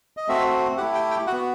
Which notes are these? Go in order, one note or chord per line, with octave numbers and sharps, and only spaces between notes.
D#5
A3 C4 F#4 E5
A3 E4 G4 F#5
G5
G5
F#4 F#5
B3